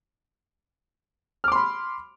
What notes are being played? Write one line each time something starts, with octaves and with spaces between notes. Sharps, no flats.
B5 C6 D6 F6